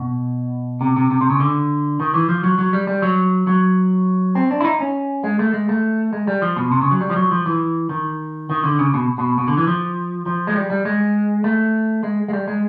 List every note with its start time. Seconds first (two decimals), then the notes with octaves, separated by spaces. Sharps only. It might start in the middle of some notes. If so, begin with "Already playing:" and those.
Already playing: B2
0.81 C3
0.96 C3
1.11 C3
1.21 C3
1.30 C#3
1.40 D3
2.00 D#3
2.14 E3
2.29 F3
2.44 F#3
2.58 F#3
2.73 G3
2.87 G3
3.02 F#3
3.47 F#3
4.35 C4
4.51 D4
4.60 E4
4.65 D#4
4.80 C#4
5.24 G#3
5.39 A3
5.53 G#3
5.69 A3
6.13 G#3
6.27 G3
6.42 F3
6.56 B2
6.72 C3
6.81 C#3
6.91 F#3
7.01 G3
7.10 F3
7.16 F#3
7.31 F3
7.46 E3
7.89 D#3
8.50 D#3
8.64 D3
8.79 C#3
8.94 B2
9.18 B2
9.38 B2
9.48 D3
9.57 E3
9.67 F3
10.26 F3
10.47 G#3
10.56 G3
10.70 G3
10.85 G#3
11.44 A3
12.03 G#3
12.28 G#3
12.33 G3
12.48 G#3